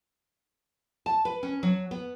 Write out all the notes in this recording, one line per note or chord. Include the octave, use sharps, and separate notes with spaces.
A5
B4
C#4
F#3
B3